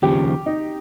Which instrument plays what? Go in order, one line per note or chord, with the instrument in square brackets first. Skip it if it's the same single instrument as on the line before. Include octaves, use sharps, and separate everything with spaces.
[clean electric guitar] D#2 C#3 F3 [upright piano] G4
[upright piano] D#4